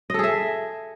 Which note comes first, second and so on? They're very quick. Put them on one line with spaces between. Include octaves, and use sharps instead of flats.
D#5 A4 G#4 E5